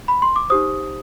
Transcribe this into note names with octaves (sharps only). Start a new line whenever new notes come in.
B5
C6
D6
D#4 G4 C5 D#6